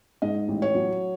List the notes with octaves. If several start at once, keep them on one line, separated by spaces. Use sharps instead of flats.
G#2 D#5
A1
C#5
F#3